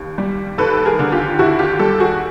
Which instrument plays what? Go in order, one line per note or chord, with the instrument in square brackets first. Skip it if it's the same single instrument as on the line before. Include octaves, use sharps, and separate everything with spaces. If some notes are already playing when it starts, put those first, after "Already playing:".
Already playing: [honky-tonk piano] D#2
G3
D#2 A4 B4
G#4 A#4
D3
F4 G4
D#2 E4 F#4
F4 G4
G3 G4 A4
F#4 G#4